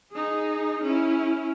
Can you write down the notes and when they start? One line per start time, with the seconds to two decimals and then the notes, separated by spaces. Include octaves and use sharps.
0.12 D#4 G#4
0.83 C#4 E4